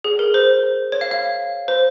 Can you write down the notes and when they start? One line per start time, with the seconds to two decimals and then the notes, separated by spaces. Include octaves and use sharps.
0.04 G#4
0.19 A#4
0.34 C5
0.92 C#5
1.01 F5
1.11 F5
1.68 C5